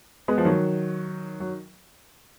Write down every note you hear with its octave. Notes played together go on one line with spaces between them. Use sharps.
G#3 B3
F3
D#3 F#3
F#3